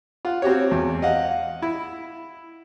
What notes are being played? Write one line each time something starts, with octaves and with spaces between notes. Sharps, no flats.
F4 F#5
C4 F#4 G4 C#5
E2
D#5 F5 F#5
E4